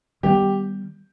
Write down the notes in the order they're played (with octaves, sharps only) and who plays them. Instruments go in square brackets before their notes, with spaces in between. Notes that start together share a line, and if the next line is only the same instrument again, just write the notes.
[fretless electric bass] D#3 G3 B3 [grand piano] G4